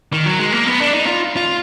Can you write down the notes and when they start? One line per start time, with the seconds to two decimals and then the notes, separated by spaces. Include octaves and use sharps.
0.13 D#3
0.26 F#3
0.39 G#3
0.52 A#3
0.66 B3
0.80 D4
0.93 D#4
1.07 F4
1.37 F4